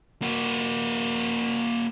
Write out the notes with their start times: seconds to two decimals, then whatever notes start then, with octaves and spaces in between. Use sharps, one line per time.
0.22 A#3 F#4